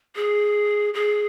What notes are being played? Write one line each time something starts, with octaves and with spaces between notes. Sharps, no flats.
G#4
G#4